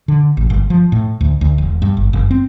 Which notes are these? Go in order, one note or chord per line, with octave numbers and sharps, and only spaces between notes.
D3
A1
G1
F3
A2
D2
D2
E1
G2
G1
F#1
C4